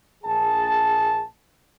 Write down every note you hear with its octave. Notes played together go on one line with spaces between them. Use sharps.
A#1 G#4 A5